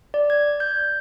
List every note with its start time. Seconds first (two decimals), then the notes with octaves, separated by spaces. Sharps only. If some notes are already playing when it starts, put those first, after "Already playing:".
0.14 D5
0.30 G#6
0.60 G6